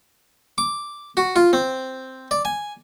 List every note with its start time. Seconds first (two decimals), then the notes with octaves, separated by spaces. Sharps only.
0.58 D6
1.17 F#4
1.36 F4
1.53 C4
2.31 D5
2.45 G#5